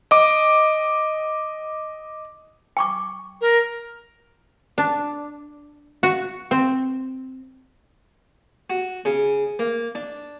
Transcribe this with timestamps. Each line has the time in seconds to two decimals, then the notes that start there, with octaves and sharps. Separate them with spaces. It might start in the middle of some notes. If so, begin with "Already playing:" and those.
0.11 D#5 D6
2.77 G5 C#6 D6
3.41 A#4
4.78 D4
6.03 F#4
6.51 C4
8.70 F#4
9.05 C#3
9.59 A#3
9.95 D4